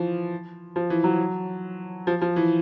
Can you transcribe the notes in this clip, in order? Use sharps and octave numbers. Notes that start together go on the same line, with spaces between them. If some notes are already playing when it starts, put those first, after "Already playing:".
Already playing: E3 F3
F3
E3
F#3
F3
F3
E3